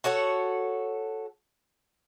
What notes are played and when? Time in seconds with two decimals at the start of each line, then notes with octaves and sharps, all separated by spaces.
0.04 F#4 A4 C#5 F#5